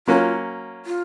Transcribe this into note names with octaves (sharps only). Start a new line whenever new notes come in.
F#3 A#3 C#4 F4
F4